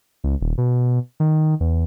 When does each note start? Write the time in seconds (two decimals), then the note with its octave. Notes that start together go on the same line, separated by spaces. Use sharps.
0.24 C#2
0.41 D#1
0.58 B2
1.20 D#3
1.61 E2